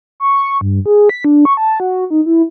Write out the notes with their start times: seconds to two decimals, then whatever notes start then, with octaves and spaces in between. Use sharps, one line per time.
0.20 C#6
0.61 G2
0.86 G#4
1.09 B6
1.24 D4
1.45 C#6
1.57 A5
1.80 F#4
2.10 D#4
2.26 E4